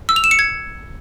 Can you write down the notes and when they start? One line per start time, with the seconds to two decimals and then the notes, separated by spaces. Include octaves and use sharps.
0.09 E6
0.16 F7
0.24 E7
0.31 C#7
0.39 G#6